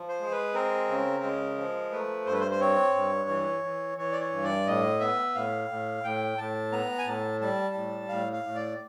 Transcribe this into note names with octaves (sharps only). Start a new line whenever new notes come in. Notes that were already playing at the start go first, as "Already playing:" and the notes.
Already playing: F3
C5
G#3
B4
C4 A#4
C#3
G#3
F3
A3 B4
G2 C5
B4
C5
C5
C4 C#5
G2
E3
E3
E3 C#5
D5
C#5
G2
D5
A2 D#5
B3 E5
A2 F5
A2
A2 G5
A2 A5
B3 A#5
G#5
A2 A5
G3 A5
A2
A2 F5
F5
A2
D5